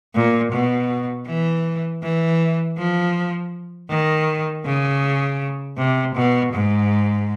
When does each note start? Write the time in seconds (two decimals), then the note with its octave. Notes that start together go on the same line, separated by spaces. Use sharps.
0.15 A#2
0.52 B2
1.27 E3
2.03 E3
2.78 F3
3.90 D#3
4.66 C#3
5.78 C3
6.16 B2
6.54 G#2